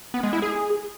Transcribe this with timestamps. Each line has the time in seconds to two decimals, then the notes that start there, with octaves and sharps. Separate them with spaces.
0.14 B3
0.23 G#3
0.33 E4
0.42 G#4